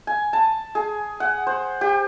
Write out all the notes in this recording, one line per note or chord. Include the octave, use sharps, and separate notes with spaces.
G#5
A5
G#4
F#5
C5
G4